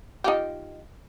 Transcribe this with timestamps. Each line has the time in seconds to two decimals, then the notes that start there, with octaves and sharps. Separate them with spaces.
0.24 D#4 F4 G4